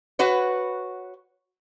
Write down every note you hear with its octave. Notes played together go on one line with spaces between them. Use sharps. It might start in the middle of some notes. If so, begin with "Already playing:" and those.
F#4 B4 C#5